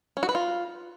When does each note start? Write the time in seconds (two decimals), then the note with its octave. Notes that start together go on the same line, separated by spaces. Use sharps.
0.17 C#4
0.23 F#4
0.29 B4
0.35 F4